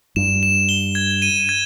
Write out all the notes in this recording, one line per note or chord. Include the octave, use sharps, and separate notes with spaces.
G2 E7
E7
G7
G#6
D#7
G#6